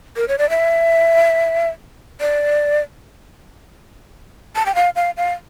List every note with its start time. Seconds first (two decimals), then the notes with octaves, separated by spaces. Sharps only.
0.16 A#4
0.28 C#5
0.38 D5
0.50 E5
2.21 D5
4.56 A5
4.66 G5
4.75 F5
4.96 F5
5.17 F5